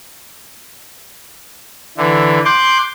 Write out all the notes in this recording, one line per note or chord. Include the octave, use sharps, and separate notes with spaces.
D3 E3
C6 D6 F#6 G6